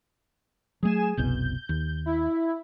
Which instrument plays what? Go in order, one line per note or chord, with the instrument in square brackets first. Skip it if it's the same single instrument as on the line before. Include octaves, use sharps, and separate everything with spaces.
[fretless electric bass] F#3 A3 [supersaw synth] G#4 G#5 E7
[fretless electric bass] F#1 C2 B2 [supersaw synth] G6
[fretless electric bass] D#2
[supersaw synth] E4